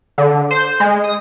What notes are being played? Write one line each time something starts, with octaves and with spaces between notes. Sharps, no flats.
D3
C5
G#3
D#6